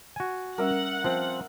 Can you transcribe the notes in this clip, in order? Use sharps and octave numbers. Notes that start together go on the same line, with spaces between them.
F#4 G#5
G3 C#4 A#4 E5 F#5
F3 C4